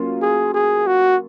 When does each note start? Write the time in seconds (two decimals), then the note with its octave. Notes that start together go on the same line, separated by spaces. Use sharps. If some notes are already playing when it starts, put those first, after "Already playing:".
Already playing: F#3 A#3 C#4 F4
0.22 G#4
0.54 G#4
0.87 F#4